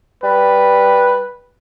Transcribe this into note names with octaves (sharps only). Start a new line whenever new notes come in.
G3 B4